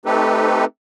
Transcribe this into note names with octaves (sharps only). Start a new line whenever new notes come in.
A3 C4 D#4 G4 A4 B4